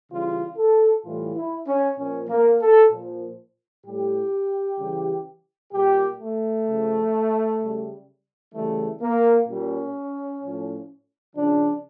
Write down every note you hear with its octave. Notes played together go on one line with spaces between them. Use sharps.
C#3 E3 G3 F4
A4
A2 E3 G3 F4
E4
C#4
A#2 F3 C#4
A#3
A4
A#2 F3
A2 G3 G4
C#3 E3 G3
A#2 G3 G4
A3
C#3 F3
C#3 G3
C#3 E3 G3 A3
A#3
A#2 G3 C#4
A2 F3
C#3 F3 D4